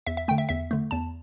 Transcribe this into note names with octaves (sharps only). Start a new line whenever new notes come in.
E2 E5
E5
D3 A3 G5
E5
E2 E5
D3 A3
E2 A5